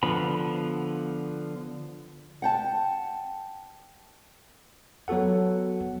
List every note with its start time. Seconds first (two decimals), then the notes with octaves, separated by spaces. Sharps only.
0.03 D3 F3 B3 B5
2.42 F#5 G5 A5
5.08 F#3 B3 F#4 A4 F#5